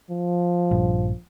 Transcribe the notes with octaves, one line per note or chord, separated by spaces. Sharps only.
F3
A#1 G2